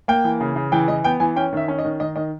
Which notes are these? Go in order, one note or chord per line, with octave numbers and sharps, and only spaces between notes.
A#3 G5
E3
C#3
C#3
E3 G5
E3 D#5
B3 G5
E3 G#5
C#4 G5
D#3 E5
C#4
D#5
D#3
D#3 D#5
D#3 D#5